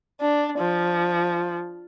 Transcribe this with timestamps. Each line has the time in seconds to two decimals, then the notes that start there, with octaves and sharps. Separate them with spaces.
0.21 D4
0.59 F3